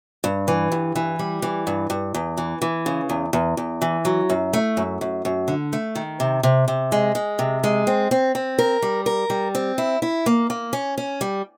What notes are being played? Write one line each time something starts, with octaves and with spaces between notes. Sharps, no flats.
G2
E3
G2
E3
G3
E3
G2
G2
E2
E3
E3
C#3
E2
E2
E2
E3
F#3
F#2
A3
F#2
F#2
F#2
D3
A3
D#3
C3
C3
C3
G#3
G#3
C3
G#3
C4
C4
C4
A#4
G3
A#4
G3
C4
E4
E4
A#3
A#3
C#4
C#4
G3